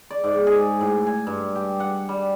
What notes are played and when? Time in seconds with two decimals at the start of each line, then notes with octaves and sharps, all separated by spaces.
0.11 D5
0.24 G#2
0.47 G#4
0.81 A2
1.07 G#5
1.27 G2
1.55 G4
1.80 F#5
2.09 G3